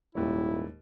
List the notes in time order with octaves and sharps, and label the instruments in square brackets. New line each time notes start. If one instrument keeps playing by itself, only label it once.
[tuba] D#1 [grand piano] D#2 G#2 C#5 [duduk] E4